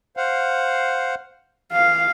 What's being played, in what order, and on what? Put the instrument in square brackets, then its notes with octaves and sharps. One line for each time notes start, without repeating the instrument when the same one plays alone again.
[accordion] C5 F5 F#5
[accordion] E3 [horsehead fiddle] F5